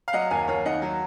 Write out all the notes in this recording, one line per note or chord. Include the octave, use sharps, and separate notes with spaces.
F5
F#3 D#5 F#5
D#2 F5 G#5
D#2 C#5 F5
D#3 D#5 F#5
F#3